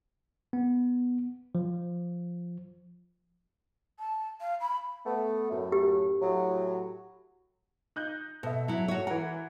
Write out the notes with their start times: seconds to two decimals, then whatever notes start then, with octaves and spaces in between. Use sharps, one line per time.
0.53 B3
1.55 F3
3.99 A5
4.41 F5
4.61 B5
5.06 A3 B3
5.50 F#2 A2
5.72 G4
6.22 A2 F#3
7.96 D#4 F#6 G6
8.43 B2 A4 E5
8.68 F#3 E4
8.88 F#4 C#5
9.07 E3 A#4 F#5